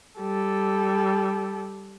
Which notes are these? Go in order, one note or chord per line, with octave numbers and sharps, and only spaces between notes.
G3 A4